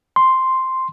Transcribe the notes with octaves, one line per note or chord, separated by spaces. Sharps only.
C6